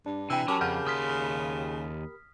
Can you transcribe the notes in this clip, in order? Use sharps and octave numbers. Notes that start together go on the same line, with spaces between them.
G2 D4
C3 E3 G5 E6
F#3 C#4 G4 A#4 A5 B5 D6
F2 C#3 F#5 F6 G6
D#2 C6 D#6 F6 B6